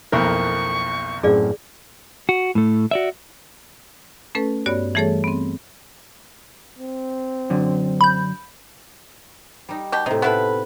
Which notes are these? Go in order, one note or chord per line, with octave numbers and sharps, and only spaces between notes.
B1 F2 A#3 E4 A#4 C#6
F#2 A2 C4 G#4 D5 F5
F#4
A2 A3
F#4 D5 E5
A3 C#4 A4 B4
G2 B3 F#4 C#5 D5
E3 G3 A3 G#4 A4 C#5
B3 C4
C4
F#2 D3
B5 G6
G3 D#4
B2 G4
A2 C3 D#4
A2 B3 E4 B4 F5 A5